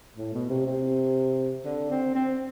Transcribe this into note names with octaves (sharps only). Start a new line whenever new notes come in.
A2
B2
C3
C3
D3
C4
C4